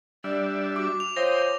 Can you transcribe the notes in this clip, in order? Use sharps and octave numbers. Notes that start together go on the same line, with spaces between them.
G3 D4 D5 E5
F#4 D6
F7
F3 C5 C#5 D#5 G5 A#6